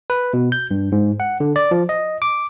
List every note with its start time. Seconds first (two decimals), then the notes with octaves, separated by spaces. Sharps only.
0.10 B4
0.33 B2
0.52 G6
0.71 G2
0.92 G#2
1.20 F#5
1.40 D3
1.56 D5
1.71 F3
1.89 D#5
2.22 D6